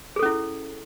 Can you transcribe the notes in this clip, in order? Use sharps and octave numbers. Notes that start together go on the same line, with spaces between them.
C#4 E4 G#4 A4